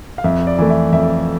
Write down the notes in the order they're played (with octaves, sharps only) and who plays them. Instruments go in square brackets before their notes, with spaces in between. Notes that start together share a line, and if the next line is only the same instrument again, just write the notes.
[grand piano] F5
F2 E5
D5
E3 A3
E5
F2 E5